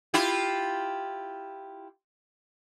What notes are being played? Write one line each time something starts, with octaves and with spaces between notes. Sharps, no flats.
E4 F4 G4